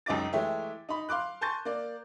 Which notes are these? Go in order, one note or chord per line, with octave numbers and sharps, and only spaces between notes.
C#2 F#2 D#4 D6 A6
E3 G#3 A3 G4 C#5 E5
D#4 B5
F5 C6 D6 F#6
G#5 A5 C6 C#6 G6 A6
A#3 D5